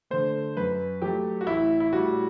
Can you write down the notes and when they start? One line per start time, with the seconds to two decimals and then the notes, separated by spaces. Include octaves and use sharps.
0.10 D3 A3 C5
0.57 F#2 B4
1.02 F#3 A3 G4
1.41 F#4
1.46 A1 E4
1.80 E4
1.92 A2 G3 F#4